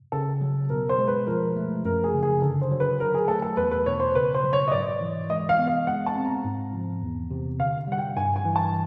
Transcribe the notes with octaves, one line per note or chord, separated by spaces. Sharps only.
C#3 A4
F#3
B2 A#4
C5
G#3
B4
F3 A#4
A3
F#2 A#4
G#4
C#3
G#4
D3 A4
C5
F#3
B4
F#3 A#4
G#4
A3 A4
A4
E2 B4
B4
B2 C#5
C5
C#3 B4
C5
F#3
C#5
D#5
G#2 D5
E3
G#3 D#5
F5
B3
F5
G#3 F#5
A5
C4
A#5
G#2
F3
E2
C3
D3 F5
G3 F#5
G5
G2 G#5
G#5
E3
A5